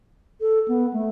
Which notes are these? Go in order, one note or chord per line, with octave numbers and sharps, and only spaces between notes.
A4
B3
A3